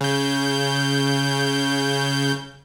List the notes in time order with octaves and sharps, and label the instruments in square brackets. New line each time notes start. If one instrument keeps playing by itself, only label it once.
[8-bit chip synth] C#3 G6